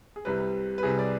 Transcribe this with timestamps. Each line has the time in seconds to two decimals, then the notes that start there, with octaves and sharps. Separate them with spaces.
0.16 G#4
0.25 C2 C3 G3 B4
0.78 B4
0.83 C2 C3 G3 G#4
0.99 D5